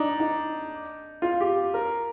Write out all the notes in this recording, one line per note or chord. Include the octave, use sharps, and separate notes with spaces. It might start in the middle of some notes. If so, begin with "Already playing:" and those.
Already playing: D4 D#4
D#4
F4
G4
A#4